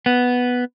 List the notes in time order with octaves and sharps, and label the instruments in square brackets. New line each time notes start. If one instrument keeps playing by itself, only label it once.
[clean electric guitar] B3